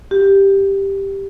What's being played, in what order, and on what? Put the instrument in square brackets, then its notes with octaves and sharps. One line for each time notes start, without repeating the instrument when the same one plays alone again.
[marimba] G4